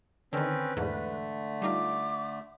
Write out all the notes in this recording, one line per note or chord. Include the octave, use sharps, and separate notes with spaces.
D3 D#3 C4 C#4 B4
E2 G#2 D3 A3
G3 D#4 F4 D6